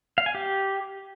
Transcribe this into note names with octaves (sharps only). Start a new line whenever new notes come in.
F5
G#5
G4